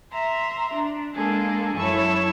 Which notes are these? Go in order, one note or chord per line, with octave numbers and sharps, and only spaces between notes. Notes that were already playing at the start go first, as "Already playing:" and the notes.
E5 A#5 C6
D4
G#3 A#3 D4 G#4 A4
F#2 E4 A4 C#5 C#6 E6